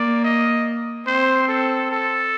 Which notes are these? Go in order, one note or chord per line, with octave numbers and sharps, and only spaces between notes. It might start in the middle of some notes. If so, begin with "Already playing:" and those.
Already playing: A#3 D5
D#5
C4 C5
A4
A4